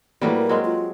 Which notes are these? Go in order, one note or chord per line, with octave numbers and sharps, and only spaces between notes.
A2 E3 F#3 G3 A#3 B4
A#4
F#3 G#3 C4
F4